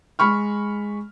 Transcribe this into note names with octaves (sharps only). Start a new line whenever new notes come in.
G#3 B5 C#6 F6